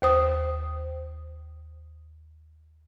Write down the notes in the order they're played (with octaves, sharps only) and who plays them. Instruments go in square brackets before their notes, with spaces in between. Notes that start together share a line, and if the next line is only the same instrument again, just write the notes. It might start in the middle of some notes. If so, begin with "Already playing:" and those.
[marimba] D#2 C5 D#6